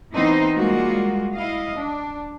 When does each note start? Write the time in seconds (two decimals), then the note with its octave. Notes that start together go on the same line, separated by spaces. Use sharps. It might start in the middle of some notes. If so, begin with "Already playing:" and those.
0.13 E3 B3 C4 D#4 C5 D#5
0.55 G3 G#3 A#3 F4 F#4
1.34 E4 D#5 F5
1.77 D4